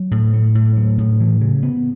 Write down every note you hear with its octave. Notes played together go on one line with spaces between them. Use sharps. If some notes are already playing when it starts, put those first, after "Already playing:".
Already playing: F#3
A2
A3
A2
F#3
A2
E3
C#3
B3